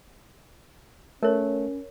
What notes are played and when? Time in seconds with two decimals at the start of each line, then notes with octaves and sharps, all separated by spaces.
1.23 A3 C#4 A#4 C#5